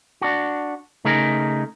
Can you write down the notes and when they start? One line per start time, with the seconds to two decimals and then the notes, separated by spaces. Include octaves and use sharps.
0.21 D4 F#4
1.05 C#3 A3 D#4 G#4 A#4